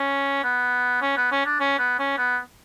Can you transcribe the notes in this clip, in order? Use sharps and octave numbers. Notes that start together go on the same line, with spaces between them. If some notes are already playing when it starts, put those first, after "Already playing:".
Already playing: C#4
B3
C#4
B3
C#4
D4
C#4
B3
C#4
B3